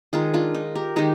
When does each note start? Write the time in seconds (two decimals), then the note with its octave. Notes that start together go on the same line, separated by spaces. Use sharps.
0.13 D#3 G#3 F4 G#4
0.34 D4 F4
0.55 D#4
0.75 G4 A#4
0.96 D#3 G#3 D#4 G4